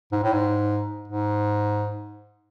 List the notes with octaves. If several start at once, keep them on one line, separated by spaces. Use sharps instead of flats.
G#2
A2
G#2
G#2